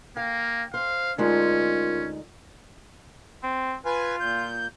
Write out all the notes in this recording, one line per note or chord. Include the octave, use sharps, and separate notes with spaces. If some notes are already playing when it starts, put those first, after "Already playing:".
A#3 F5 G5
C5 F5
D2 G#3 C#4 D#4 F4 A#4
C4
F4 B4 G#5
A#2 G6